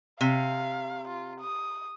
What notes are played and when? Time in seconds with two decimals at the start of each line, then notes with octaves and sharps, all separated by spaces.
0.21 C3 F5
1.08 F4
1.41 D#6